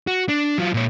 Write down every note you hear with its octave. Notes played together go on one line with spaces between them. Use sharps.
F#4
D4
F#3 F4
A#2 C#5